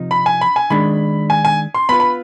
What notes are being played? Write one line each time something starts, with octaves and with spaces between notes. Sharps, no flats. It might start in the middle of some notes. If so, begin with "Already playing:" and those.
Already playing: C3 F3 D#4
B5
G#5
B5
G#5
D#3 G#3 D4 B5
G#5
G#5
C6
B3 F4 B4 B5
B5